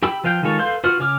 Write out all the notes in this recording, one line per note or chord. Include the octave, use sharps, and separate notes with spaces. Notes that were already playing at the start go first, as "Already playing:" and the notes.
G4 G5 B5 E6
F3 B4 F5 G5 G6
D#3 G#3 F4 A4 C#5
A4 B4 F5 C6 G6
F4 F#4 B4 F#5 F6
C#3 C#5 D6 F6